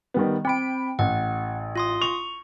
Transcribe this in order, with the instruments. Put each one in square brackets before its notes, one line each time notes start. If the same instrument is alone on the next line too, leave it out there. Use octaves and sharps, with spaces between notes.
[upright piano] D#3 G3 B3
[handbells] C4 D7 [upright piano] G5 B5
[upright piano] A1 [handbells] F#5
[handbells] F4 C6 D#6
[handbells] C#6 [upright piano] F7